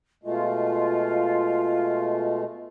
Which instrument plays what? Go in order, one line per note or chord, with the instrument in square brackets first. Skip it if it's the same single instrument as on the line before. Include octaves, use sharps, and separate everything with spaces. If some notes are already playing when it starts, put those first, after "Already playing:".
[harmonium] B2 G#3 A3 [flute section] F4